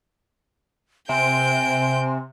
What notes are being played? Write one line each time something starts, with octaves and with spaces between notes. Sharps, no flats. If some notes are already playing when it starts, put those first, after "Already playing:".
C3 C4 G#5 G6 D7